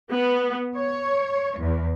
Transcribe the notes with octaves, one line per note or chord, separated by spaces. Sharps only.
B3
C#5
E2